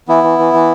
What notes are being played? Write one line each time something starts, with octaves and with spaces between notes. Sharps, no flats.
E3 B3 E4
E3
E3
E3